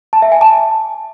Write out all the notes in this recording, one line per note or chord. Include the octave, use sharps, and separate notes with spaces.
A5
E5
G#5
A5